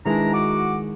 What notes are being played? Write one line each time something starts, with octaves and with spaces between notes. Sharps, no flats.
D#3 E3 G#3 D4 E4 A#5
F#4 F#5 D6